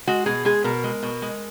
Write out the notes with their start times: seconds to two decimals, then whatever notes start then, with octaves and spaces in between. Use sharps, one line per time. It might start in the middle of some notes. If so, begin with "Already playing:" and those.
0.07 G#3 F#4
0.26 B2 G#4
0.45 G#3 G#4
0.64 B2 A#4
0.84 G#3
1.03 B2
1.22 G#3